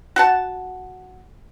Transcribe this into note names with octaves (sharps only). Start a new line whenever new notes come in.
F#4 F#5 A5